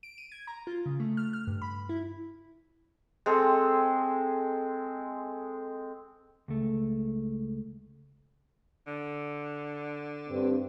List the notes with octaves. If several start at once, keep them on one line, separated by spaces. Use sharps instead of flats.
D7
D#7
G#6
A#5
F4
C#3
A3
F6
F6
G2
B5
E4
G#3 C4 A4
C#2 A3
D3
G2 C4